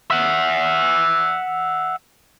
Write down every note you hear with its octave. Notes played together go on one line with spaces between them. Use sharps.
E5 F#5